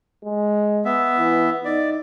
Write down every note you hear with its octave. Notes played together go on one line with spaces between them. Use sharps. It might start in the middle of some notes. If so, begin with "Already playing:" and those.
G#3
B3 E5
E3
D#4 D5